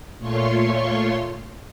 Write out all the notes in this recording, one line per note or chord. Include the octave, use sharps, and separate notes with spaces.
A#2 A3 F4 C#5 C6 C#6